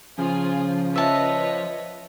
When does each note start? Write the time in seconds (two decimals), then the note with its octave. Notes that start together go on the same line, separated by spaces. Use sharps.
0.18 C#3 F3 F4 G#4 G#5
0.96 B4 C#5 D#5 E5 A5